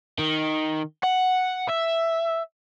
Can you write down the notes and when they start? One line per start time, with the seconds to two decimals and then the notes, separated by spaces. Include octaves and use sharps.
0.19 D#3
1.04 F#5
1.69 E5